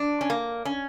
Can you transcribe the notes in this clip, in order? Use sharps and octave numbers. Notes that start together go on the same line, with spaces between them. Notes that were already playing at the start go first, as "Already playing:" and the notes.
Already playing: D4
C#4
A#3
C#4